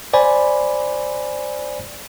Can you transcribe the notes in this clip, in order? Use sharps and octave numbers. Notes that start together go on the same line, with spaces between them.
C5 D5 G#5 B5